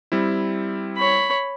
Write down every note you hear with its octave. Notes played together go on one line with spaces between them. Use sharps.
G3 C4 E4
C#5 B5